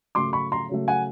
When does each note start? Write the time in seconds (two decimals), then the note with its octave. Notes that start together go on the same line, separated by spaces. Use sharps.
0.15 C#3 F#3 A3 C6 D6
0.33 B5 C#6
0.52 A#5 C6
0.69 C#3 F#3 A3
0.88 F#5 G#5